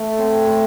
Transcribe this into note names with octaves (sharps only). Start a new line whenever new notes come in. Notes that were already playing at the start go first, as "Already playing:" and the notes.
Already playing: A3
C4
A3